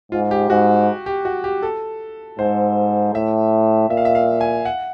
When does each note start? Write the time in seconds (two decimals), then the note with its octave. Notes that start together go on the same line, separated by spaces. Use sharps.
0.12 G#2 F4
0.31 G4
0.49 G#2 F#4
1.06 G4
1.25 F#4
1.44 G4
1.62 A4
2.39 G#2 C5
3.14 A2 E5
3.90 A#2 E5
3.97 F5
4.05 E5
4.15 F5
4.41 G#5
4.65 F#5